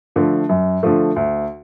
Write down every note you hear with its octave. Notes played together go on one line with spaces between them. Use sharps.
D3 F3 A3
F#2
D3 F3 A3
D2